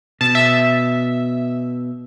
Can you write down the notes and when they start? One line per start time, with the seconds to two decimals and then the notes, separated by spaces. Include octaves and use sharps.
0.21 B2 A5
0.35 E5